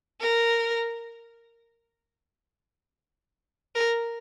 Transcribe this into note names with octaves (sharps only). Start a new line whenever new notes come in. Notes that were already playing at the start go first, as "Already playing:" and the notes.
A#4
A#4